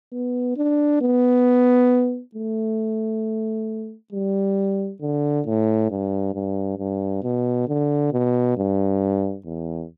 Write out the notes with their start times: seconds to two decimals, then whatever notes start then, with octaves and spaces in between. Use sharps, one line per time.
0.13 B3
0.57 D4
1.01 B3
2.35 A3
4.13 G3
5.01 D3
5.46 A2
5.91 G2
6.34 G2
6.78 G2
7.23 B2
7.68 D3
8.12 B2
8.57 G2
9.45 E2